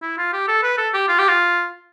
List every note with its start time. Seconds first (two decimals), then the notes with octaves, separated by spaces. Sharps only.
0.03 E4
0.18 F4
0.33 G4
0.48 A4
0.63 B4
0.78 A4
0.94 G4
1.08 F4
1.19 G4
1.28 F4